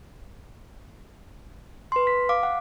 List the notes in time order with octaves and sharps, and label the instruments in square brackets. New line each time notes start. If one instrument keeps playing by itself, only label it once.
[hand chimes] B4 C6
B6
F5 D6
F#5